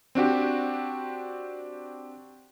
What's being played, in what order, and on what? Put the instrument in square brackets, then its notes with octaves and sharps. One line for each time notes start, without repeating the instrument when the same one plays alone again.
[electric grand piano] C4 D4 F#4 G4